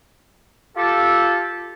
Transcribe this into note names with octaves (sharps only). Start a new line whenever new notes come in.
F4 G4 A4